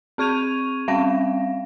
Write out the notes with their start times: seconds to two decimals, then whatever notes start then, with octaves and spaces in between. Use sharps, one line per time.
0.18 C4 G#4 C#6 G#6 D#7 F7
0.88 G3 C4 F5 G5 A#6